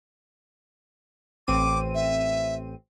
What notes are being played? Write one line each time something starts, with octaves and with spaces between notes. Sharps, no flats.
A1 C4 D6 D#7
E5